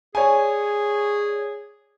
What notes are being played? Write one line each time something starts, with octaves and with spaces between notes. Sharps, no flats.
G#4 C#5 D5 G#5